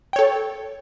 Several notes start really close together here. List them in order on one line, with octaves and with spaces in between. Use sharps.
G5 C#5 A4